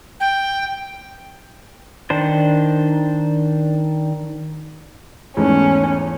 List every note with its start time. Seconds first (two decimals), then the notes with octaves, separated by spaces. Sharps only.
0.20 G5
2.10 D#3 D4 C5
5.37 E2 G#2 A3 C#4